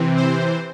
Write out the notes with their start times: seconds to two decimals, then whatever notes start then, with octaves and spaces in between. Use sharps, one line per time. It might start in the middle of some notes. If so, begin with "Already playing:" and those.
Already playing: C3 E3 C4
0.17 C5